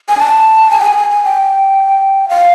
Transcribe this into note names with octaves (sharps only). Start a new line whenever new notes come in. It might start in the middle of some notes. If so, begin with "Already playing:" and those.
G#5
A5
G#5
G5
G#5
G#5
G#5
G5
F5